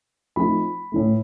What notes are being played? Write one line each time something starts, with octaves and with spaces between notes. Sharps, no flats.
F3 A3 C4 D#4 B5
A2 E3 A3